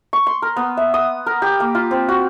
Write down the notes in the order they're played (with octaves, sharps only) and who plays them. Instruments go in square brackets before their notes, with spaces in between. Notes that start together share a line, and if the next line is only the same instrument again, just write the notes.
[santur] C#6
C6
A#4
B3
E5
D#6
A#4
G4
A#3
F4
C4
F#4